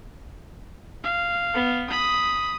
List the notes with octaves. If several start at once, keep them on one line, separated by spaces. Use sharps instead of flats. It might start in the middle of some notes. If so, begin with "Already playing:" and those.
F5
B3
B5 D#6